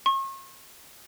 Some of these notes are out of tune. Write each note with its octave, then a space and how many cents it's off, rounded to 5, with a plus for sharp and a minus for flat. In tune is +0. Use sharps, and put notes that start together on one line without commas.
C#6 -40